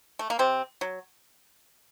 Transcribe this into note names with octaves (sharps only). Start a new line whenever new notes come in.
A3
A#3
C3 C4
F#3